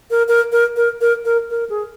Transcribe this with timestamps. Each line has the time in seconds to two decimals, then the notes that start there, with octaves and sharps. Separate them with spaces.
0.11 A#4
0.28 A#4
0.52 A#4
0.76 A#4
1.01 A#4
1.25 A#4
1.50 A#4
1.70 G#4